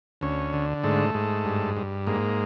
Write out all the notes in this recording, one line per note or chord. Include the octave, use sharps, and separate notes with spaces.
D2 C#4
D3
G#2 A3
G#2
G2
G2
G#2 A#3